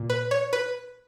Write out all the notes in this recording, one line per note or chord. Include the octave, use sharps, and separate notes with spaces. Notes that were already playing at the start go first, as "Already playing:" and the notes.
Already playing: A#2
B4
C#5
B4